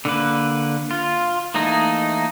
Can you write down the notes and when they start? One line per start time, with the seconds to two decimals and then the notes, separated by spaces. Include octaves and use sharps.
0.05 D3 A#3 B4
0.91 F4
1.54 E3 A3 A#3 D#4